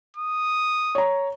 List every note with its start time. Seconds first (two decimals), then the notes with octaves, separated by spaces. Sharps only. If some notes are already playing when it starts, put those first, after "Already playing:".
0.17 D#6
0.95 C#5 A#5